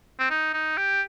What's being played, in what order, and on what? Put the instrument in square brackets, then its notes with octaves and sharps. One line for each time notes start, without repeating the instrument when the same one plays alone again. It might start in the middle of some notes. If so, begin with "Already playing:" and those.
[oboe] C4
D#4
D#4
G4